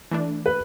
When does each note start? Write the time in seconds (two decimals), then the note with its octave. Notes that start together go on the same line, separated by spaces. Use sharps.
0.11 E3 A3 D4
0.46 B4